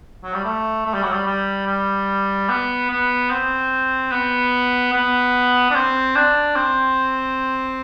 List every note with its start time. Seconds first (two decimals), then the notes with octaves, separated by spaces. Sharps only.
0.24 F#3
0.34 G3
0.44 A3
0.86 A3
0.94 G3
1.03 F#3
1.12 G3
1.27 G3
1.66 G3
2.49 B3
2.90 B3
3.31 C4
4.12 B3
4.93 B3
5.70 D4
5.75 C4
6.16 D4
6.56 C4